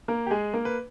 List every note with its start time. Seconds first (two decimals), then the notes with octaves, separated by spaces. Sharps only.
0.08 A#3 A#4
0.26 G4
0.31 G#3 G#4
0.54 A#3 A#4
0.65 B4